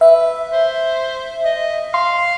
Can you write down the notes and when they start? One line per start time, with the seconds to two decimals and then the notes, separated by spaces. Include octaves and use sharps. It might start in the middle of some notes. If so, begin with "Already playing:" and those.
0.01 B4 E5
0.52 C5
1.45 D#5
1.94 F5 C6